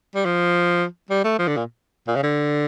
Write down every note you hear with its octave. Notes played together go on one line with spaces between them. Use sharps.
G3
F3
G3
A3
F3
D3
A#2
A#2
C#3
D3